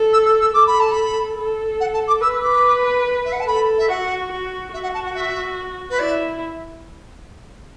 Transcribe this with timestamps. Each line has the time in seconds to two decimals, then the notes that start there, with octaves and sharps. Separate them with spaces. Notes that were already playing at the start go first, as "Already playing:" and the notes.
Already playing: A4
0.13 E6
0.26 E6
0.41 E6
0.54 A4 D6
0.66 B5
0.80 A5
0.91 B5
1.38 A4
1.80 F#5
1.94 A5
2.07 D6
2.21 B4 E6
2.42 D6
3.25 E5
3.32 F#5
3.40 A5
3.47 A4 B5
3.78 E5
3.89 F#4 F#5
4.31 F#4
4.73 F#4 E5
4.83 F#5
4.94 A5
5.05 F#5
5.14 E5
5.90 B4
5.99 E4 D5